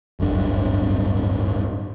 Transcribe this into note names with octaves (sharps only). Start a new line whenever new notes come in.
D1 G1 F#2 D4